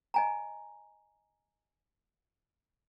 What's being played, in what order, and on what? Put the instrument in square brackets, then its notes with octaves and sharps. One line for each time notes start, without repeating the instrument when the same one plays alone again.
[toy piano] D#5 G#5 A#5